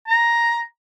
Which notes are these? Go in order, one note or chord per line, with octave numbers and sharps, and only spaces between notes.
A#5